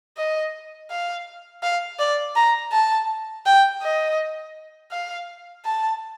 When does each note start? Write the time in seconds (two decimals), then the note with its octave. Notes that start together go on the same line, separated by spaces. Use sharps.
0.17 D#5
0.90 F5
1.63 F5
1.99 D5
2.36 A#5
2.72 A5
3.46 G5
3.82 D#5
4.92 F5
5.65 A5